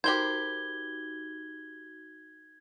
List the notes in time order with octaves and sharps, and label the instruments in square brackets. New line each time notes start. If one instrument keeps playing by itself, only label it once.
[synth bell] D#4 F#4 [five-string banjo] G4 A#4 C5 [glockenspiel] G#6 G7